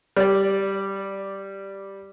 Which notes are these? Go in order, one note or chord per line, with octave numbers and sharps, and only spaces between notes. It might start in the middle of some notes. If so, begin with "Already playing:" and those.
G3 D5